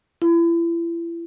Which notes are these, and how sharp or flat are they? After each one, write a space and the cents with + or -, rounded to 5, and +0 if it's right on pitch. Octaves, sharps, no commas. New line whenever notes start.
E4 +35